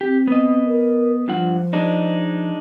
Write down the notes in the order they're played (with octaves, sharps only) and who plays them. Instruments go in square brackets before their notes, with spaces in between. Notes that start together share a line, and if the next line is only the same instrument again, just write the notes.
[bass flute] C4 [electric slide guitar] G4
[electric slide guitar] B3 D#5
[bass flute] A#4
[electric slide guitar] G2 F4 F#5 [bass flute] F3
[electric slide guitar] G#3 D4 D#4